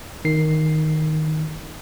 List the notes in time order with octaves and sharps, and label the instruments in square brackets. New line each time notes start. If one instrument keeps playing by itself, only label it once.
[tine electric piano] D#3 C7